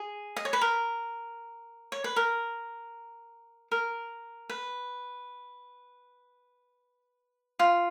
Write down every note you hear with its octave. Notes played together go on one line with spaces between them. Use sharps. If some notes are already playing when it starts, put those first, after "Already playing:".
Already playing: G#4
D#5
C#5
B4
A#4
C#5
B4
A#4
A#4
B4
F4